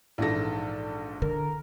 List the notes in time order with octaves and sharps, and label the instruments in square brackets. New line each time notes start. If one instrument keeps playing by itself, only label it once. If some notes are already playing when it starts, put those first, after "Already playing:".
[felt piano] A#1 G#2 A#6 [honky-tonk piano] E3 A4
[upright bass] D3 [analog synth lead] A#4